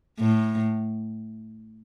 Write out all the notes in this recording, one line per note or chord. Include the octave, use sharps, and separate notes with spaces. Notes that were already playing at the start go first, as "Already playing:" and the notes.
A2